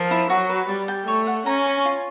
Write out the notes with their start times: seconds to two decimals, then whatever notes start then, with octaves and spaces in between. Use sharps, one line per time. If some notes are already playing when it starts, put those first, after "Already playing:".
Already playing: F3 A#4
0.11 E4
0.30 F#3 F#4
0.49 B4
0.69 G3 D5
0.88 G5
1.07 A3 C#5
1.27 F#5
1.46 C#4 A#5
1.66 C#5
1.85 F4